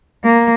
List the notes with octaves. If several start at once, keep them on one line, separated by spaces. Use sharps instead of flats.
A#3